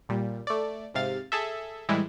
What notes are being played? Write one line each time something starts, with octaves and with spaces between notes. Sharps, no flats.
A#2 G3
A3 D5
G#2 C3 F5 A6
G#4 A4 E5
A2 E3 G3 G#3 E4